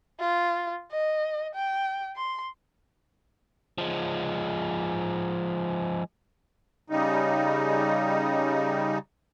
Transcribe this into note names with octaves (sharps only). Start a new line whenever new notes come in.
F4
D#5
G5
C6
F3 G#3
C#3 G3 D#4